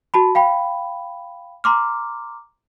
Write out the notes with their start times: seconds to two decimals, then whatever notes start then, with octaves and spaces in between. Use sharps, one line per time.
0.14 F#4 A5 B5
0.35 F5 G5 B5
1.64 A#5 C6 D6 F6